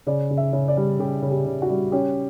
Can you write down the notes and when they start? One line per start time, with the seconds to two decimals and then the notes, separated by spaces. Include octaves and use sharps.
0.07 C#3 D5
0.30 C#3
0.37 E5
0.53 C#3
0.68 D5
0.77 G3
0.99 C#3 G4
1.22 C#3
1.30 G4
1.46 C#3
1.62 F#4
1.70 G3
1.92 C#4 G4